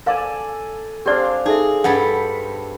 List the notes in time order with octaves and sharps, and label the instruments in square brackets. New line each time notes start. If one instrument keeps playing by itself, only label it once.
[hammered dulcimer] A4 D5 G#5 [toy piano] A#4 F5
[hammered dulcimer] C4 D4 F5 [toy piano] G4 D5
[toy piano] D#4 A4 E5 [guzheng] G#4
[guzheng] G2 A4 B5 [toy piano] F#5